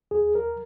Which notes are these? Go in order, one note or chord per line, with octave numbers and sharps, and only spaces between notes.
D#2 G#4
A#4